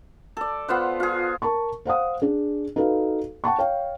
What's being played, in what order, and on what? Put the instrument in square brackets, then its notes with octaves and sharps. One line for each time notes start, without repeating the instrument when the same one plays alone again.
[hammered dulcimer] A4 D5
B3 F4 C5 F#5
F4 G#4
[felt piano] A#4 A5 C#6
C5 F5 F#5 D#6
D4 G#4
D#4 F#4 A4 B4 F5
F#5 G5 A5 C#6
C#5 F5 G5